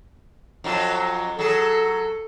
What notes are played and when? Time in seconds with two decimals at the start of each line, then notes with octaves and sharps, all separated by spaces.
0.64 F2 F#3 F4
1.39 F#3 G#4 A4